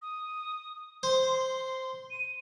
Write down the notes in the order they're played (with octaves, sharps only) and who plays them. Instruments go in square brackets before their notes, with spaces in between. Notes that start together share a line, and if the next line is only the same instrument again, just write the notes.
[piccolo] D#6
[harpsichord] C5 [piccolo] C6
[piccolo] D#7